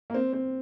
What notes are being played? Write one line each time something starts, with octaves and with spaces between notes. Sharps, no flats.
A#3
C4
C4